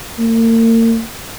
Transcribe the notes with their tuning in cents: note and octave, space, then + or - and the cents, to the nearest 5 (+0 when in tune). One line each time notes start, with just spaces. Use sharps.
A#3 -40